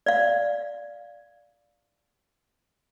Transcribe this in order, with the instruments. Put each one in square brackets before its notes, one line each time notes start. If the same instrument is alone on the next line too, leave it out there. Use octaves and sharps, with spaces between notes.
[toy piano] D5 F5